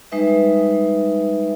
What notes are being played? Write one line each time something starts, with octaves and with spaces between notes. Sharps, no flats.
G3 G#3 D#4 B4 E5